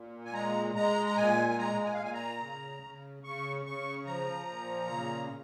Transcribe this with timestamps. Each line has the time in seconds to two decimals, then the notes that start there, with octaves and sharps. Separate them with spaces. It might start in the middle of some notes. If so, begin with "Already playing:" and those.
Already playing: A#2
0.25 G#5
0.33 G#3 A#5
0.75 G#3 A#5
1.06 A#5
1.16 A#2 G#5
1.49 G#5
1.58 G#3 A#5
1.85 G#5
1.94 F5
1.99 A#2
2.04 G#5
2.13 A#5
2.41 C#3
2.83 C#3
3.23 C#3 C#6
3.66 C#3 C#6
4.06 F3 A#5
4.47 A#2
4.90 C#3